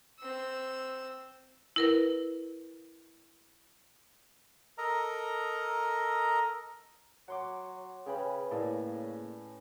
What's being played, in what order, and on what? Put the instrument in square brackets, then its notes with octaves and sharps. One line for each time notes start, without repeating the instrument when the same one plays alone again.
[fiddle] C4 E6
[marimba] E4 A#4 B4
[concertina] A4 A#4 D#5 A#5
[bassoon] F#3 [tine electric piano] F#5 C6 D6
[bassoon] C#3 [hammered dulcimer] C#4 B4 [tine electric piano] G#4 G5 B5
[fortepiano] A2 [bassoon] C#3 [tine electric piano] A#3 G#4 D5 [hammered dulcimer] G#5